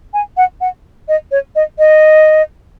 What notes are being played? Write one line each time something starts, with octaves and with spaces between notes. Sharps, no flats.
G#5
F#5
F#5
D#5
C#5
D#5
D#5